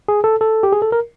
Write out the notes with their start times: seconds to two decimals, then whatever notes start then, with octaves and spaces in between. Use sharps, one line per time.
0.08 G#4
0.24 A4
0.41 A4
0.63 G4
0.73 G#4
0.82 A4
0.92 A#4